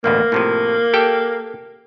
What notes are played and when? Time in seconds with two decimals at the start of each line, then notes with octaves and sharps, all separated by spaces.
0.04 A1 D2 B2 A#3
0.32 A2 C3 F3
0.93 G4 A4 G5